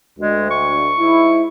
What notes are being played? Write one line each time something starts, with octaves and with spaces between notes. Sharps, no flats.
D2 G#3
C#6
G#2 E4